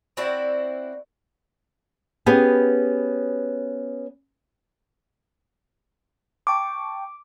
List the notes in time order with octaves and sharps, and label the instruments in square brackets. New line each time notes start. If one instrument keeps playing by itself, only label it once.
[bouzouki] C4 E4 F#4 D5
[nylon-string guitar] B3 C#4 G4 G#4
[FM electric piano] G5 A5 C#6 [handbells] D6